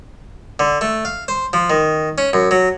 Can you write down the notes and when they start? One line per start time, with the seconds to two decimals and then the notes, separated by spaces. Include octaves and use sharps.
0.59 D3
0.81 A3
1.05 F5
1.28 C5
1.53 F3
1.70 D#3
2.18 C#4
2.33 F#2
2.51 F#3